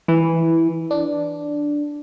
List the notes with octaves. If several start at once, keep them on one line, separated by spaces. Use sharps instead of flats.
E3
D4